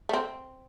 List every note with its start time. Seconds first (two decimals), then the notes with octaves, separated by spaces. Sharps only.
0.09 A3
0.13 C4